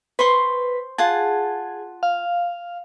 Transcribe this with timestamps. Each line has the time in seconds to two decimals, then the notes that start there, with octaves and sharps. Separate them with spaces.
0.19 B4 C5 C6 C#6
0.98 F4 G#4 F#5 A5
2.03 F5